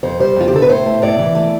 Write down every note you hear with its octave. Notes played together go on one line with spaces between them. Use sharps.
F2 C5
G3 C5
F2 F4
G4
D3 A4
B4
A2 C5
A3
A2 D5
E3
A3